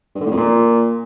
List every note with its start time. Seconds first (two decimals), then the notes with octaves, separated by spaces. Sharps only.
0.15 G2
0.20 D3
0.26 A2
0.31 F2
0.37 A#2